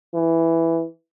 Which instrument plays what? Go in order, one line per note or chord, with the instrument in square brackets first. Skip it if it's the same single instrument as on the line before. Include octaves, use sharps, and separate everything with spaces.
[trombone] E3